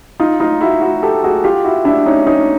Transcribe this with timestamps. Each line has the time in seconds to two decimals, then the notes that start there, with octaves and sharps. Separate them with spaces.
0.20 D#4 F4
0.40 D#4 F4
0.61 E4 F#4
0.81 E4 F#4
1.03 G4 A4
1.24 F#4 G#4
1.44 F4 G4
1.64 E4 F#4
1.85 D4 E4
2.06 C#4 D#4
2.27 C#4 D#4